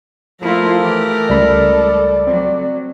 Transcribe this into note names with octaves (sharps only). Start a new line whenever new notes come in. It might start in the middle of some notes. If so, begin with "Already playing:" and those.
F3 A3 E4 F4 A#4
E3 G4
C#2 G3 A4 D5 B5
F#3 C4